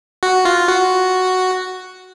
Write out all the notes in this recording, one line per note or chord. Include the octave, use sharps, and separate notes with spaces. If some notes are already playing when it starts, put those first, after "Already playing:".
F#4
F4
F#4